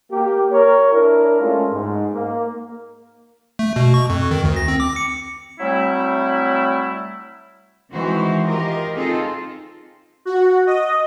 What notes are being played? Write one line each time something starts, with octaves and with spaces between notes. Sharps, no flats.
A#3 G4
A#4 C#5
D4 E4 A#4
G#3 A3 C#4 F4
G#2
A#3
A3
B2
C#6
F2
D#3
D2
A#6
C4
D6
C#7
F#3 G3 A3 C4 E4
D#3 E3 G#3 C4 F#4 C5
F4 G4 A#4 D#5
C4 D#4 F4 G#4 A4
F#4
D#5